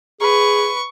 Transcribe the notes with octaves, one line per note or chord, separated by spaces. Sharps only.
G#4 B4 C#6